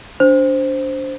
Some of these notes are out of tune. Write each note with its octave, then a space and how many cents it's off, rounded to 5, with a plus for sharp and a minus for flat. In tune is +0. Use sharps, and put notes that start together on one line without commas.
D4 -20 C5 +0